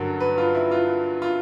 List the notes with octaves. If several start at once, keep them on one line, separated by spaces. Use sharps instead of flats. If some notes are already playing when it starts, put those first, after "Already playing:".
Already playing: G2 D3 F#3 A#4
B4
F4
E4
F4
F4